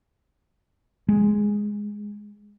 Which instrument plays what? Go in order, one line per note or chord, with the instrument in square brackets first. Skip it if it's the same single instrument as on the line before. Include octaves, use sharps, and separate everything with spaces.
[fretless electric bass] G#3